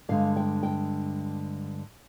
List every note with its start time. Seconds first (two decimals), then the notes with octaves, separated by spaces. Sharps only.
0.09 G2 D3 G#3 F5
0.36 G5
0.63 G5